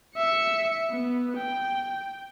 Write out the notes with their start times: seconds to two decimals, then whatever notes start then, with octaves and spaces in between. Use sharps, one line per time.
0.16 E5 C#7
0.91 B3
1.37 G5